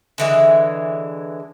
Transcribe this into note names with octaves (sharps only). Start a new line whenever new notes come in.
D3 E3 G#3